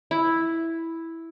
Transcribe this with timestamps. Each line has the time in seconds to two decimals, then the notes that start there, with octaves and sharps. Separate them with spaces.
0.11 E4